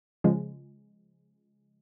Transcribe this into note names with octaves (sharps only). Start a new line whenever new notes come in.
C#3 F3 G#3